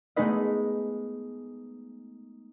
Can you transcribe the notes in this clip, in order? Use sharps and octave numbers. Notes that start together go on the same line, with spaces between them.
G#3 A3 B3 D#4 B4 D#5